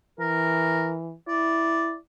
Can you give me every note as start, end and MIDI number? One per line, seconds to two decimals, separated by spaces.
0.19 1.14 52
0.19 0.93 70
1.28 1.97 64
1.28 1.95 74